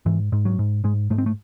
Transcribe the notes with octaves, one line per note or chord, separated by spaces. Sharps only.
G#2 E3
G#2
F#3
G#2
G#2 G#3
G#2 A3
C4
A3